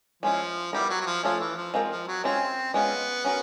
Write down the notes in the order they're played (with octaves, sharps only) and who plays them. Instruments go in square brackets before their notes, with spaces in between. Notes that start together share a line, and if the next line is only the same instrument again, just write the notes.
[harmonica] F3 [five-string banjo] G#3 C#4 E4
[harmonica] G3 [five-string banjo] B3 E4 G4 A#4
[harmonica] F#3
F#3
F3
[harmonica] F3 [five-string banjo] A3 C#4 F4 A4 C#5
[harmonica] E3
F3
[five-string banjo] G#3 C4 F4 A#4
[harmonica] F3
F#3
[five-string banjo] G#3 C#4 F4 A#4 C#5 [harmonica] C4
[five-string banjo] G#3 C#4 F4 [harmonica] B3
[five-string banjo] C#4 F#4 A#4